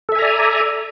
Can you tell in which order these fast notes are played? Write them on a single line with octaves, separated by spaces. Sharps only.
A4 E5 G#5 A#5 D5